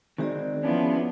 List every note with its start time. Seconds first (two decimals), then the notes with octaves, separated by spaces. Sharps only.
0.18 D#3 G#3 C4 F#4 G#4 D5
0.63 F3 B3 C#4 D4 E4